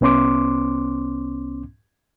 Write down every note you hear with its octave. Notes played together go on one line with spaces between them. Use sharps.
C2 B3 C#4 C6 D6